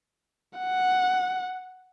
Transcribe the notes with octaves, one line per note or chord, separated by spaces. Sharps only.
F#5